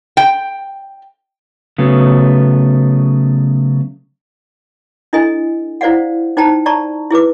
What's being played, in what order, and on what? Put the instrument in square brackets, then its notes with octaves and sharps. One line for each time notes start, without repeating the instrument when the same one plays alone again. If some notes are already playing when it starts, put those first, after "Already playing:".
[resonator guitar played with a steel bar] G5
[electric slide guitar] C#3 F#3 A3 B3
[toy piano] D4 E4 A4 D#5 G#5
E4 C5 D5 F5 F#5
D#4 C5 G5 A5 A#5
D5 A5 A#5 C#6
E4 G#4 B4 D6